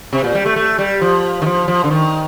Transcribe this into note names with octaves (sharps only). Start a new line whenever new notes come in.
C3
A#2
G3
A3
A3
G3
F3
D#3
F3
F3
D3
D#3